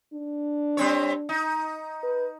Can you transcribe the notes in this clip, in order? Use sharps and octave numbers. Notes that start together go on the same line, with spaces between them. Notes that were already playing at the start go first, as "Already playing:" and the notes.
D4
G3 C4 C#5
D#4
B4